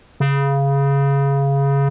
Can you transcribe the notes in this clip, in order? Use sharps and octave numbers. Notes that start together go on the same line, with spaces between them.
C#3